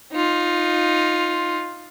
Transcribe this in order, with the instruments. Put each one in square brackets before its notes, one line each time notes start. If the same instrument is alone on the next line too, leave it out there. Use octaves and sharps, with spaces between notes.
[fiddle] D#4 F4